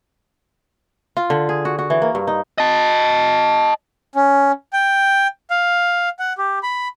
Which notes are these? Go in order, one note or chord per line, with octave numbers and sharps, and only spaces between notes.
F4
D3
G#4
F#4
F#4
E3
A#3
G2
D#4
D#5 A5
C#4
G5
F5
F#5
G4
B5